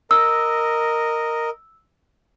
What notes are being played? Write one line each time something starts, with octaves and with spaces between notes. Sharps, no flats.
A#4 D#5 E6